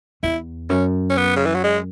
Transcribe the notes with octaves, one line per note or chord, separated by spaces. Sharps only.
E2 E4
F#2 C#4
C#4
B3
C#3
E3
F#3
G#3